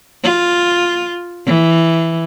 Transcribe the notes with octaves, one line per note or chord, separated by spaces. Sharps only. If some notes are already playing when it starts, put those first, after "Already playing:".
F4
E3